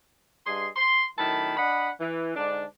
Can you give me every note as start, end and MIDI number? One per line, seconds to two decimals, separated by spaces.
0.45 0.68 43
0.45 0.68 68
0.45 0.68 75
0.45 0.68 84
0.76 1.05 84
1.17 1.56 42
1.17 1.56 45
1.17 1.56 51
1.17 1.56 81
1.17 1.56 83
1.57 1.89 62
1.57 1.89 75
1.57 1.89 78
1.57 1.89 83
2.00 2.32 52
2.36 2.64 44
2.36 2.64 50
2.36 2.64 62